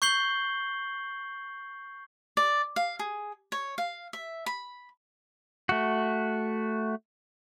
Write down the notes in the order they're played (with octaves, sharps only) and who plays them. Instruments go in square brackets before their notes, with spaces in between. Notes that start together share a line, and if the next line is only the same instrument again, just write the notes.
[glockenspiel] C#6 G6 C7 F#7 G7
[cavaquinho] D5
F5
G#4
C#5
F5
E5
B5
[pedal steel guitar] A3 F#4